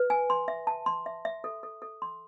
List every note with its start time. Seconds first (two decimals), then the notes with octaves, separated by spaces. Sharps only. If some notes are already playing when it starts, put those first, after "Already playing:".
Already playing: B4
0.10 G#5
0.30 C6
0.48 E5
0.67 A5
0.86 C6
1.06 E5
1.25 E5
1.44 A4
1.63 A4
1.82 A4
2.02 C6